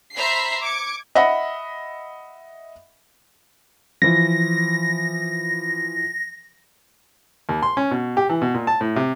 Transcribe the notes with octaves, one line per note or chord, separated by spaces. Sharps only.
C5 E5 A#5 B5 B6 C7
D6 G#6 C#7
D#5 E5 F#5 B5
E3 F3 A#6
D#2
C6
C#4
B2
G4
E3
B2
A#2
A5
A2
C3